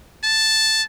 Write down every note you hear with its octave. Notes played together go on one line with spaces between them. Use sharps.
A5